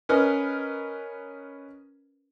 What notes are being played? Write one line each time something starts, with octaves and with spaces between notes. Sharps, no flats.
C#4 A#4 B4 D#5